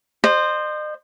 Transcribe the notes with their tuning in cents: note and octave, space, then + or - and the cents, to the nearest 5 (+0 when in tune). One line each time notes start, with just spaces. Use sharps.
C5 +0 D#5 -40